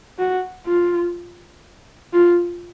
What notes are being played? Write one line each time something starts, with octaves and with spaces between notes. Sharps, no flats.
F#4
F4
F4